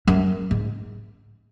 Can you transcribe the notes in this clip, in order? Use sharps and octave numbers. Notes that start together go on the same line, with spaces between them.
F#2
G#2